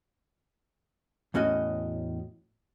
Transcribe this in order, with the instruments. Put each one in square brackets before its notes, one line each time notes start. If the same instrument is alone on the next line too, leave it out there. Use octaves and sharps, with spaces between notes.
[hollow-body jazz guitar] E2 A2 C#4 F#4 D#5